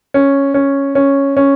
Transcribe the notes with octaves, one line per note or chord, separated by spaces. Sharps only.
C#4
C#4
C#4
C#4